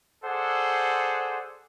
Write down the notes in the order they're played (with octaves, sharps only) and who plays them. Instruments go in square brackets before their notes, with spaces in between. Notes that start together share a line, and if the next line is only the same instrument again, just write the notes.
[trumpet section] G#4 A4 C5 D5 F#5